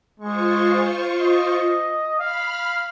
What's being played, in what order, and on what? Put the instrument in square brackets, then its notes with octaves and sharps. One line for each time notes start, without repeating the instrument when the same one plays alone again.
[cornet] G#3 [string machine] F4 C5 C#6
[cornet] D#5
[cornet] F5 [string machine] B5 F6